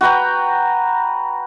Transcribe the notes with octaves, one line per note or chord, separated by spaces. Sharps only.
F#4 B4 G5 A#5